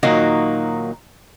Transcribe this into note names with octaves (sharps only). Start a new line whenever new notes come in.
A#2 D#3 F#3 A#3 D#4 F#4